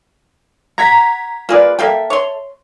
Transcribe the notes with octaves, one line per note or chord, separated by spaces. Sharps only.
F#5 A#5 G#6 B6
A#3 F4 G#4 B4 D5
A#3 A4 E5 F5 G5
C#5 C6